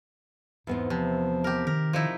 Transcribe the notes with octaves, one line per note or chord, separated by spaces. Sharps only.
E2 G#2 B3 C4
C3 F3
G4 A#4
D#3 A#4
F3 D#4 E4